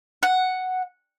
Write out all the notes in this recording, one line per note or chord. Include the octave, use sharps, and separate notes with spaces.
F#5